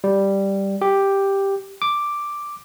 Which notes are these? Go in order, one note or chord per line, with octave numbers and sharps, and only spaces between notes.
G3
G4
D6